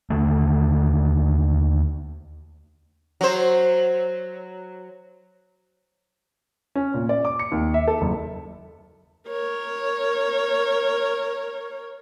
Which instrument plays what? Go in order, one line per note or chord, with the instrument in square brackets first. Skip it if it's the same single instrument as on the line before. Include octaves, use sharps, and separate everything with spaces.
[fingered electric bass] D#2 D3 A3
[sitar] F#3 C5
[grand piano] C#4
A#2
D5
D6
C#7
D#2
E5
A4
F#1
[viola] A#4 C#5